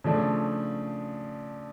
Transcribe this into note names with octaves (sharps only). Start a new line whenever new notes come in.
C#3 F3 A3 D4